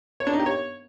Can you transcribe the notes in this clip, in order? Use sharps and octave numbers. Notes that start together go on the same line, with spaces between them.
C#5
D4
D#4
G4
C#5